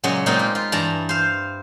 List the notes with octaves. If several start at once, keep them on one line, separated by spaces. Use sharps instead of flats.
A#2 C#3 F#3 G#3 C#4 C#5
A#2 G#3 A#3 C4 D#4 F4
B4
F4
G2 E3 D5 A5 A#5
C5 F5